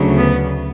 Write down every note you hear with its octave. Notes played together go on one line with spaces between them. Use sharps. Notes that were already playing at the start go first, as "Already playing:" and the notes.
Already playing: D2 C#3 F#3
B3